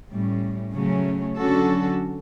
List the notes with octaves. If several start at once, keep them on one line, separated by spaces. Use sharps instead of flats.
A2 G3 C#4
C#3 F#3 A3 C#4
D3 F#3 C#4 F#4 A4